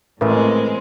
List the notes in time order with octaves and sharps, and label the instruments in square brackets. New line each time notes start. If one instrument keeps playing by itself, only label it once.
[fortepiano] A1 [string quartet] A2 G#3 C4 [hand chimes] A#4 B4